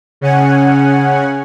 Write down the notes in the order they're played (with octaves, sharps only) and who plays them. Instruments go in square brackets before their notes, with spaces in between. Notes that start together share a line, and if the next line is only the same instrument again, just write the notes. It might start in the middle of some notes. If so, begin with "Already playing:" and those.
[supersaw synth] C#3 C#4 F#5 G#5